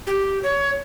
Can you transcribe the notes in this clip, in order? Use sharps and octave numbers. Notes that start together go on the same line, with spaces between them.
G4
C#5